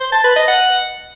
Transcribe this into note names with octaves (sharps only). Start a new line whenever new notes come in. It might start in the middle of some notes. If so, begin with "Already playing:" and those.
C5
A5
B4
D#5
F#5